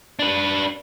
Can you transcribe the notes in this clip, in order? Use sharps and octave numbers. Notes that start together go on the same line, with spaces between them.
D4 B4